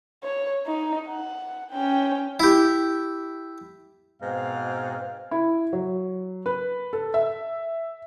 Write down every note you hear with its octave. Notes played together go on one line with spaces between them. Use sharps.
C#5
D#4
F#5
C#4 G5
E4 G4
G#2 B2 C4 F5
E4
F#3
B4
A4
E5